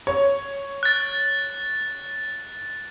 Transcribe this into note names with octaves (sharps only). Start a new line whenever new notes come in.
C#5
F#6 A6